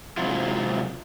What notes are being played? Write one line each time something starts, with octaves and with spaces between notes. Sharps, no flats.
G#2 C3 F#3 E4 F4